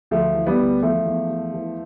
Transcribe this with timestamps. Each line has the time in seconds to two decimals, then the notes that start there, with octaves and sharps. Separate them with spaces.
0.11 D2 F3 A3
0.34 E3
0.47 G3 B3
0.58 D2
0.82 E2 F3 A3
1.06 E2
1.30 E2
1.53 E3